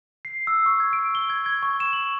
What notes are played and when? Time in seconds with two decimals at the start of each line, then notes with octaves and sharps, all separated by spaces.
0.25 C7
0.47 E6
0.66 C#6
0.80 G#6
0.93 D7
1.15 G7
1.30 G#6
1.46 G#6
1.63 C#6
1.80 E7
1.93 F#7